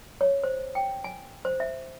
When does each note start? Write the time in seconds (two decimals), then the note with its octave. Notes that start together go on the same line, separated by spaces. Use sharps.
0.21 C#5
0.44 C5
0.75 G5
1.04 G#5
1.45 C5
1.60 E5